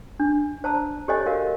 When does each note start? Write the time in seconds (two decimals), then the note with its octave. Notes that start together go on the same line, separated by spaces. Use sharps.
0.20 D4
0.64 C5 A5 A#5 E6
1.08 G4 A4 C5 C#5 D#5 G#5
1.26 F#4 A#4 D#5 F5